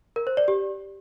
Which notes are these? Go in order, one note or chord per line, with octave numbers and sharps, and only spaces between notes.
A#4
C5
D5
G4